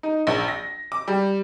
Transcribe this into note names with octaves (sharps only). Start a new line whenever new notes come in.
D#4
A#1
A#6
D6
G3